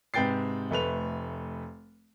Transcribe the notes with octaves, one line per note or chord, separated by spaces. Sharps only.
G#2 C3 B4 G5 A6 C7
F1 A3 B4 F7